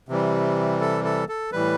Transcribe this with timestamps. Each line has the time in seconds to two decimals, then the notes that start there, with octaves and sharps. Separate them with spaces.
0.09 C3 E3 G3
0.81 A4
1.04 A4
1.29 A4
1.52 A2 E3 G3 B4